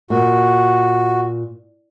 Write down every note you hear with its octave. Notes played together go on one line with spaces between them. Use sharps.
A#2 F#4